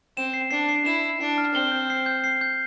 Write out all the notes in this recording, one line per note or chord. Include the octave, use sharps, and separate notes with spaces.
C4 E7
C7
D4 C7
C7
E4 E7
E7
D4 C7
F6
C4 G7
G6
C7
G6
C7
G6